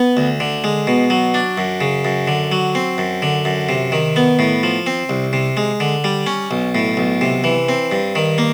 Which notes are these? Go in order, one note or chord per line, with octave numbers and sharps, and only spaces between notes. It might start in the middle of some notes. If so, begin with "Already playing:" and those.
Already playing: B3
D2
D3
G#3
B2
F#3
D4
F#2
C#3
F#2
D3
F#3
C4
F#2
D3
F#2
C3
D#3
B3
A2
F3
C4
C2
C3
G#3
D3
G3
C#4
B1
A2
B1
C3
E3
C4
G2
D#3
A#3